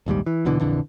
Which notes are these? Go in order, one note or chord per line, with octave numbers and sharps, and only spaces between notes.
A#1 D#2 G#2 G3
E3
D#1 B2 D3 E3
A#1 F2 D3 E3